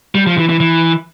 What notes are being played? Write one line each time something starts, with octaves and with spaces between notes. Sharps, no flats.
G3
F3
E3
E3
E3